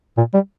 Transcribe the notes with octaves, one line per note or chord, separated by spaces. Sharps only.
A#2
G3